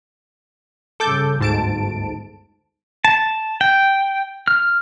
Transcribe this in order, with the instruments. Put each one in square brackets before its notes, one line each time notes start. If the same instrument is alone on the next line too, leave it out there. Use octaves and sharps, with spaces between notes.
[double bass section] G2 C#3 [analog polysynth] A4 D6 G6
[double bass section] G1 D2 [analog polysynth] G#2 A5 D7
[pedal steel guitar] A5
G5
F6